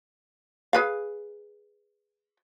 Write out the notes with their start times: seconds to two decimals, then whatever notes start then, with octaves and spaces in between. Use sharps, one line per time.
0.73 G#4 B4 F5